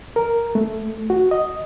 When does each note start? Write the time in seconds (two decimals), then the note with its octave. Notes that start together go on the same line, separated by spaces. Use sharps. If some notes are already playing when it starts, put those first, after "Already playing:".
0.16 A#4
0.55 A3
1.10 F#4
1.31 D#5